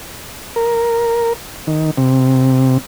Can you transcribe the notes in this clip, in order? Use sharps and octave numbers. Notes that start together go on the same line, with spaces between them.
A#4
D#3
C3